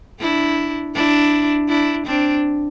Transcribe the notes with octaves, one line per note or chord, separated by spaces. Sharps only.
D4 E4
D4 E4
D4 E4
C4 D4